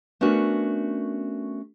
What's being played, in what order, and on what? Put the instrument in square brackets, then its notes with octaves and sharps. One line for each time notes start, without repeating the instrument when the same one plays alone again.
[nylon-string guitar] A3 B3 C#4 D4 F#4 A#4